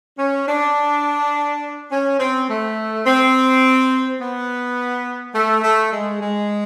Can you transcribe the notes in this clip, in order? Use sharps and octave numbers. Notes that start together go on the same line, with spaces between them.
C#4
D4
C#4
C4
A3
C4
B3
A3
A3
G#3
G#3